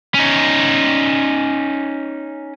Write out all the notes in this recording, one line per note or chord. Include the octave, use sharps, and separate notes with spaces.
C#4 D#4